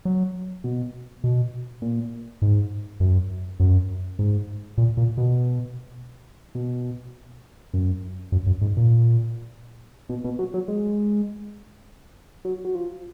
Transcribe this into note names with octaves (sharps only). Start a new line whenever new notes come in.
F#3
B2
B2
A#2
G#2
F#2
F#2
G#2
A#2
A#2
B2
B2
F#2
F#2
F#2
G#2
A#2
B2
B2
F#3
F#3
G#3
F#3
F#3
F3